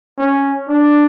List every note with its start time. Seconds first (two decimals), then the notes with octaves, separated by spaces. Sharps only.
0.18 C#4
0.69 D4